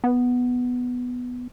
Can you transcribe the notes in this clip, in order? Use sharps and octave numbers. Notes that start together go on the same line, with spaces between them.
B3